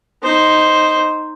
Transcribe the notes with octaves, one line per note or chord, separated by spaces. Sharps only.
D#4 C5